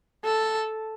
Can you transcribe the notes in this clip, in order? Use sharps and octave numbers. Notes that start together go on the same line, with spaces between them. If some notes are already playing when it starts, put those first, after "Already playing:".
A4